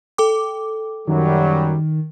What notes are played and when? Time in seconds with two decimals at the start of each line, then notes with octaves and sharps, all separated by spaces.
0.18 A4 G5 D6
1.07 F#2 D#3 F#3 G3